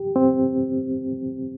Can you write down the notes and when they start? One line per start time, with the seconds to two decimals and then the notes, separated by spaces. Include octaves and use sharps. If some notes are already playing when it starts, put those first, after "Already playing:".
Already playing: G4
0.16 C4